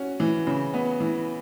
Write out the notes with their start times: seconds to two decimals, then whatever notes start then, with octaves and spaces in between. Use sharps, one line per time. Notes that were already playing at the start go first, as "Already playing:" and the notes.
Already playing: C#4 F#4
0.20 E3
0.47 C#3
0.74 B3
1.00 E3